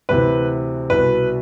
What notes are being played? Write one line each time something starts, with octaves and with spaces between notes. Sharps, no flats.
D2 C3 E3 B4
C2 B2 B4